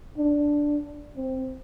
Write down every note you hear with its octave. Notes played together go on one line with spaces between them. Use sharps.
D4
C4